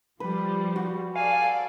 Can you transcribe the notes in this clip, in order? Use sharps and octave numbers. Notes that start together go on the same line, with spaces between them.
F3 G3 B4
F#4
A4 D5 F5 G#5